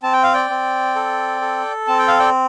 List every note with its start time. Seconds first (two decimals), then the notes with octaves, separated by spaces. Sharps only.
0.03 C4 A5
0.13 G5
0.23 F5
0.33 D5 G5
0.50 C4
0.96 A4
1.41 A4
1.87 C4 A5
1.99 G5
2.08 F5
2.19 D5 G5